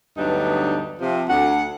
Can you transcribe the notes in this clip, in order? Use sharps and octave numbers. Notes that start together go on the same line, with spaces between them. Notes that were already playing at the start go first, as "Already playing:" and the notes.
D2 G2 F#3 B3 D4 D#4
C3 F3
D2 F#5